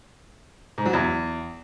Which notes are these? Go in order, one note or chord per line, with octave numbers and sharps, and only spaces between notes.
G#2
F#3
E2